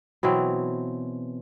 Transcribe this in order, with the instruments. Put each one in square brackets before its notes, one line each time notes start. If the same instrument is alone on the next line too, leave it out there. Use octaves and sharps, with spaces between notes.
[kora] B2 E3 F#3 C4